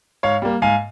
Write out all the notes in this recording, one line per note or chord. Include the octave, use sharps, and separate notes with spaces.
G#2 C#5 F5
G3 A#3
G#2 F5 G#5